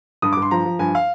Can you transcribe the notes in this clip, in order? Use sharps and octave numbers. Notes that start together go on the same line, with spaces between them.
G2 D#6
G2 D6
C6
F3 A#5
F3
G2 G#5
F5